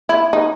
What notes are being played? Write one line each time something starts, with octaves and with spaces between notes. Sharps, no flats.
E4
D#4